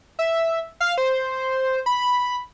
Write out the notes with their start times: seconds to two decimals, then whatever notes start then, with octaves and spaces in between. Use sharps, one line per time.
0.19 E5
0.80 F5
0.98 C5
1.86 B5